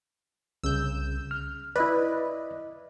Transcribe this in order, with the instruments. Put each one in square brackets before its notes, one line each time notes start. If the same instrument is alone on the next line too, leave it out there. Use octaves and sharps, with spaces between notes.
[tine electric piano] C2 C#3 [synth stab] E6 G6
[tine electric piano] F6
[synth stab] E4 B4 [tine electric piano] D5 D#5